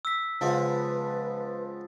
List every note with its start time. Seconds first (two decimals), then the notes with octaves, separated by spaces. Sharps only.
0.05 E6 B6
0.41 C#3 F3 G#3 B3 B4